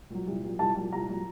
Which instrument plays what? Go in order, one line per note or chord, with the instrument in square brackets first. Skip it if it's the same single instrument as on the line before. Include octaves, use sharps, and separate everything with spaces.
[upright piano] A#2 F#3
C2
A#2 F#3
C2 A5
A#2 F#3
C2 A#5
A#2 F#3